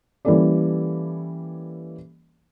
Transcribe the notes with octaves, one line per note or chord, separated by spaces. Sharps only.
E3 G3 A#3 C#4 A4 D5